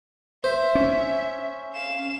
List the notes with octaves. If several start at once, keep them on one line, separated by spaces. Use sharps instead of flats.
C5 E5
C#4
F5 E7